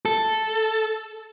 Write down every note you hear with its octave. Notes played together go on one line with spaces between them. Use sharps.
A4